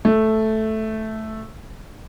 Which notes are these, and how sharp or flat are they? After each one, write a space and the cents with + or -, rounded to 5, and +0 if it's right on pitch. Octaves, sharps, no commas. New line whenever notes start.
A3 -5